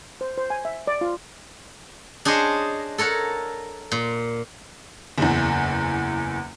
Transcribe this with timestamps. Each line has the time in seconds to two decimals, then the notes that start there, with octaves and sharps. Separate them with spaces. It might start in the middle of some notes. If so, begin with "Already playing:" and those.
0.21 C5
0.38 C5
0.50 G#5
0.65 E5
0.87 D5
1.01 F4
2.25 D4 G#4 C5 C#5 D#5
2.98 A4 A#4 C#5 F#5
3.92 A#2
5.18 F#1 E2